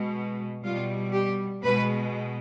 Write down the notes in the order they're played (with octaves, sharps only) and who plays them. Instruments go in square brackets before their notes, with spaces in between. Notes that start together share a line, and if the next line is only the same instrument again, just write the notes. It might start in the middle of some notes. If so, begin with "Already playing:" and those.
Already playing: [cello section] B2 G#3
B2 G3 F4
G4
B2 G#3 B4